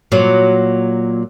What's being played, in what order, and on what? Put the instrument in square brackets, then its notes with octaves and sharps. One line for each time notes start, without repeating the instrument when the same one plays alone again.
[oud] A#2 F#3